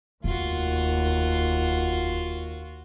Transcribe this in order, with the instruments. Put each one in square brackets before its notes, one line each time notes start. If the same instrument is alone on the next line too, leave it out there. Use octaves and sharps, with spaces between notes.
[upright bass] F1 [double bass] D#2 [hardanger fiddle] F4 F#4